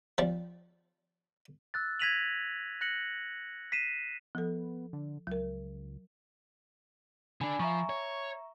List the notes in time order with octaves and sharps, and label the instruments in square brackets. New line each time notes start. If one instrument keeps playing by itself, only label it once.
[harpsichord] F3 G3
[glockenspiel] E6 F#6 A6
G#6 A#6 B6 D#7 F7 F#7
F#6 A#6 C#7 F#7
B6 C7 D#7 E7
[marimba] F3 A4 [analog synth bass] B3
[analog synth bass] D3
[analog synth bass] C#2 [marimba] F#3 A#4
[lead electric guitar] D3 D4 [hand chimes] G#5 B5
[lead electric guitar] F3 [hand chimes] E5 A#5 C#6
[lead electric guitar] C#5